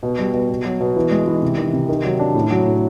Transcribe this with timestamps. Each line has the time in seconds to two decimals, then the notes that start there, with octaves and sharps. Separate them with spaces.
0.03 B2
0.19 G3
0.34 B2
0.49 B2
0.65 F#3
0.80 B2
0.96 E3
1.11 G#3
1.27 E3
1.42 C3
1.58 D#3
1.73 C3
1.89 D#3
2.04 F#3
2.19 D4
2.35 A2
2.50 F#3
2.66 A2